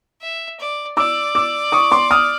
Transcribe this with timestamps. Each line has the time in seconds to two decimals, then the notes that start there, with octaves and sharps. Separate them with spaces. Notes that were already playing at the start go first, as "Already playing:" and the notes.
0.22 E5
0.60 D5
0.97 D5 D6 E6
1.35 D6 E6
1.72 C#6 D#6
1.91 C6 D6
2.11 D#6 F6